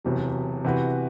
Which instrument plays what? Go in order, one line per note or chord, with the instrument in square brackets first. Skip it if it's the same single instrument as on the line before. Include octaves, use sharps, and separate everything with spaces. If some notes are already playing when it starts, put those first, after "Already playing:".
[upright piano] E1 E2 C3 F#3
C3 E3 B3 F#4 B4